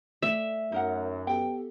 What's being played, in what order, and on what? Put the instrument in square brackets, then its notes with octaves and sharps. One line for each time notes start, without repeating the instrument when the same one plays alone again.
[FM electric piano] A3 [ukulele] D5 [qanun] E5
[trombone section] F#2 [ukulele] D#4 A#4 F#5
[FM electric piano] B3 G4 A4 [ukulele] G5